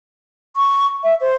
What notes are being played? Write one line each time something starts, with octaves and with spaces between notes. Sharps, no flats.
C#6
E5
C5